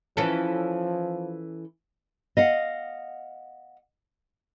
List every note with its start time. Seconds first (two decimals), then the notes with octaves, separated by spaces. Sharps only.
0.17 E3 F3 C#4 A4
2.37 D#5 F5 F#5